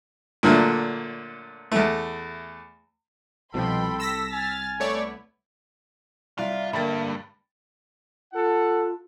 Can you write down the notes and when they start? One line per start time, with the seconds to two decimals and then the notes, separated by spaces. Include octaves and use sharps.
0.43 A#2 D3 F#3 A3
1.72 E2 A3
3.54 C2 B2 F3 A4 G5 B5 C6
4.00 E6 A#6 B6
4.32 G#5 F6 A6
4.80 A3 B3 E4 C#5 D5
6.38 C2 F4 D5 E5
6.73 G2 D3 A#3 B5 A6
8.33 F4 A4 F#5